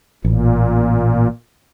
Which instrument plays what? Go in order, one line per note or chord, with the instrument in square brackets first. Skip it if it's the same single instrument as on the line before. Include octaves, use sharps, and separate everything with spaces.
[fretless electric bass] A1 [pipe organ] A#2